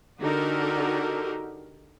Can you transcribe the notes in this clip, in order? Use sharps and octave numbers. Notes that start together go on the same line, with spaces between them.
D3 D#4 F#4 G4 A#4